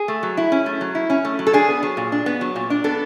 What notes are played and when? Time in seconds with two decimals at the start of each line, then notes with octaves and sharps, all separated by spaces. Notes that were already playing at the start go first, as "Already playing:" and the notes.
Already playing: G#4
0.08 A3
0.23 F#3
0.37 E4
0.52 C#4
0.66 A3
0.81 F#3
0.95 E4
1.10 C#4
1.25 A3
1.39 F#3
1.47 A4
1.53 D4 G#4
1.68 B3
1.83 F#3
1.97 A#2
2.12 D4
2.26 B3
2.41 F#3
2.56 A#2
2.70 D4
2.84 B3 A4